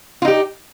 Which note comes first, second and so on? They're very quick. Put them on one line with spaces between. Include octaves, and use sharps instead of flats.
F4 D#4 G4